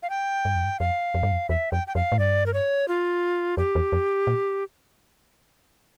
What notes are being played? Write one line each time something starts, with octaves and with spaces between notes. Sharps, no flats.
F5
G5
G2
F2
G2
F2 F5
F2
G2
F2
E2 E5
F2 G5
G5
F2 F5
A2
G2 D5
A#4
C#5
F4
F2 G4
E2
F2
A#2